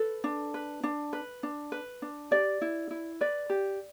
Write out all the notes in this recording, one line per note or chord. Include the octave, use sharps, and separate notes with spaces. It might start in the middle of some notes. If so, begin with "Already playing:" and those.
Already playing: A4 B4
D4
B4
D4
B4
D4
B4
D4
G4 D5
E4
E4
B4 D5
G4